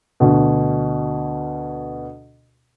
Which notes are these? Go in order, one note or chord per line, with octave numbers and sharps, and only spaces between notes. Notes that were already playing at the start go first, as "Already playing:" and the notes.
D2 B2